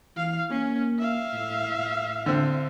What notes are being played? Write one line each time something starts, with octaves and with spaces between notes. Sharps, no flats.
E3 F5
A#3 C#4
E5 F5
A2
A2
D3 C4